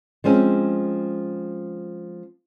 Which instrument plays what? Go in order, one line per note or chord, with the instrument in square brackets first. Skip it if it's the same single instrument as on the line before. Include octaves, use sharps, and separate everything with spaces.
[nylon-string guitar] F3 G#3 C4 C#4